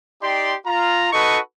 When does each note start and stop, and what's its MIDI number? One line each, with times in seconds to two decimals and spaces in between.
0.22 0.55 63
0.22 0.55 67
0.22 0.55 74
0.22 0.55 79
0.22 0.55 84
0.66 1.10 65
0.66 1.10 82
1.12 1.39 63
1.12 1.39 66
1.12 1.39 69
1.12 1.39 71
1.12 1.39 75
1.12 1.39 85